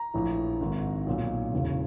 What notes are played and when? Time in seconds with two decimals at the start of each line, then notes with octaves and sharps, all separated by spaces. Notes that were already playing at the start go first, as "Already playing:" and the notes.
Already playing: A#5
0.14 A#1 A2 E3
0.60 G#1 G#2 D#3
1.07 B1 A#2
1.53 E1 E2 C#3